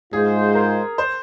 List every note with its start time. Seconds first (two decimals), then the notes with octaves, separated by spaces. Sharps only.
0.13 G#2 G#3 F4 G#4 C5
0.55 A#4
0.98 C5